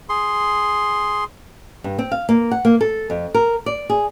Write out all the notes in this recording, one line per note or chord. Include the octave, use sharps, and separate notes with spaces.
G#4 C6
G2
C4
F5
A#3
F#5
A#3
A4
F2
A#4
D5
G#4